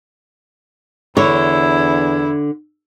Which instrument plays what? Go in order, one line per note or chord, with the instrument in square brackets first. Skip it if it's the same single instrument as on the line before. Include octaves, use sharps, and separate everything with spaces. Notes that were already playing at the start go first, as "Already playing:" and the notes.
[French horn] E2 [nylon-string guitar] D3 C#5 [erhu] E4